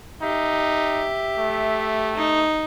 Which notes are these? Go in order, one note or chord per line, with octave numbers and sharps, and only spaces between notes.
D#4 G4 E5
A3
D#4